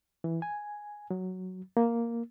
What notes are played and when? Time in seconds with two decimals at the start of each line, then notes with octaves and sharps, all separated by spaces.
0.24 E3
0.42 G#5
1.11 F#3
1.77 A#3